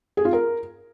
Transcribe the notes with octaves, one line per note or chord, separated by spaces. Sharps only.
G#4
F4
A#4